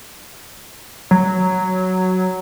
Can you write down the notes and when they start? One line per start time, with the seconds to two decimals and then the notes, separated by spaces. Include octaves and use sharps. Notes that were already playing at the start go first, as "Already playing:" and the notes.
1.11 F#3